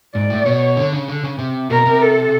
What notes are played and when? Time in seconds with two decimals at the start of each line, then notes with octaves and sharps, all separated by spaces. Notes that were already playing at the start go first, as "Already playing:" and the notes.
0.15 G#2 D5
0.30 A2
0.45 B2 C#5
0.77 D3
0.93 C#3
1.08 D3
1.24 C#3
1.39 C3
1.70 B2 A#4
1.86 C3
2.02 A4